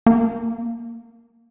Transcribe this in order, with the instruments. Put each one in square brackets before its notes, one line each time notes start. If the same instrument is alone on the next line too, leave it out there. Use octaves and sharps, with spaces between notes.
[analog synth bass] A#3